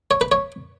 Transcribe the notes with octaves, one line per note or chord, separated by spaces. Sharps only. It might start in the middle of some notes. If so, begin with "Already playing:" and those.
C#5
B4
C#5